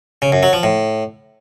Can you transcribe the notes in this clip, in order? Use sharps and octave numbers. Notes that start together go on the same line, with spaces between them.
C#3
F#2
F#3
F3
A2